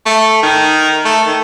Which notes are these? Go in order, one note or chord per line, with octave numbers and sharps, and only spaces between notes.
A3
D#3
A3
D#3